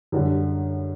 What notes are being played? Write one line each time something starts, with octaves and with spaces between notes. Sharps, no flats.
F#2 D3 G3